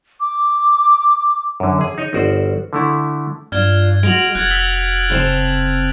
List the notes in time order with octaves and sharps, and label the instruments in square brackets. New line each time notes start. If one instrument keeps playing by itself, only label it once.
[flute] D6
[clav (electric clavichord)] F#2 D3
G#4
D#4 C#5 D#5
G1 F#4 C5 D5
D3 A3 E4
[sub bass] G2 [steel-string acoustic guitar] D4 F4 [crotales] F6 G#6 G7
[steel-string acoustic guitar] G#3 F#4 [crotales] D7 F7 F#7
[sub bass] F1 [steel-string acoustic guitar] F#4 [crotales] F#6 G#6 A6
[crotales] E6 B6 G7
[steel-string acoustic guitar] C#3 C4 A5